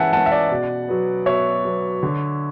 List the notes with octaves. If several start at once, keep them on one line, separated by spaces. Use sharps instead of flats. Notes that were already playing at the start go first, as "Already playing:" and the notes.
Already playing: E3 G#3 C#4 E5 F#5 G#5 A5
G#3 C#4 F#5 A5
E5
D5 F#5
B2
F#3 B3
B2 C#5 E5
F#3 B3
D3